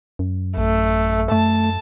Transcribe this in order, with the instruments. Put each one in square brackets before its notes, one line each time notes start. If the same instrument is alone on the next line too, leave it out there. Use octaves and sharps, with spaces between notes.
[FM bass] F#2
[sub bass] A1 [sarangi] A3
[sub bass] F#2 [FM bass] A3 [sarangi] A5